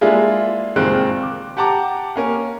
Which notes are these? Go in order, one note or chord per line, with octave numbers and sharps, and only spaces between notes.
G#3 A#3 D4 E4 F4 G#4
F#1 A#2 D#3 G#3 C4 F#6
D6
G4 F#5 A5 A#5 D6
A#3 C#4 A#4